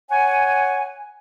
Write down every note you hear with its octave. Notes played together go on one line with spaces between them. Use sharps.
C#5 F#5 G#5